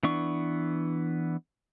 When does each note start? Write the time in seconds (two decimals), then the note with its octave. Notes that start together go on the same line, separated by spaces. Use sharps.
0.03 E3 B3 D4 C#6